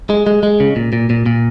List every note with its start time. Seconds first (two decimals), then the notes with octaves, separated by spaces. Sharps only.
0.10 G#3
0.27 G#3
0.43 G#3
0.60 C#3
0.76 A#2
0.93 A#2
1.10 A#2
1.26 A#2